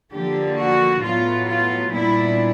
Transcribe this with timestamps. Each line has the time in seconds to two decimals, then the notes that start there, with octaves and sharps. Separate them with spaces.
0.13 D3 F3 A#3 D4 G4
0.58 F#4
1.03 A2 F#3 B3 F4
1.48 F4
1.93 A#2 G3 B3 D4 E4